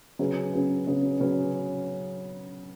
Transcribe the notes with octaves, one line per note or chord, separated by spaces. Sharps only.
C#3 F#3 C#4 G#4 B4
C#3 F#3 C#4 G#4 B4
C#3 F#3 C#4 G#4 B4
C#3 F#3 C#4 G#4 B4